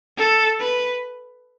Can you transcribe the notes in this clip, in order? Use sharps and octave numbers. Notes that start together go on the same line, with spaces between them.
A4
B4